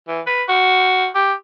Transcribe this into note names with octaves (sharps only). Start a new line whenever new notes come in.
E3
B4
F#4
G4